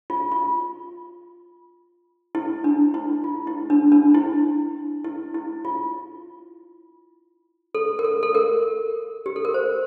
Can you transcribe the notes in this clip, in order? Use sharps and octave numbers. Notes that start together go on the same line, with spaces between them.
F4
F4
E4
D4
E4
F4
E4
D4
D4
E4
E4
E4
F4
A4
A#4
A4
A4
A#4
G4
A4
A#4
C5